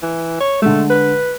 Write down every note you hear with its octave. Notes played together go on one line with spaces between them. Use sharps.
E3
C#5
D3 G#3 A3
B4